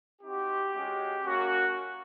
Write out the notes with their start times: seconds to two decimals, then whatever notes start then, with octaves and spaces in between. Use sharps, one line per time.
0.22 C4 D#4 F#4 G4
0.74 G#3 C#4 F#4
1.25 A#3 C#4 F#4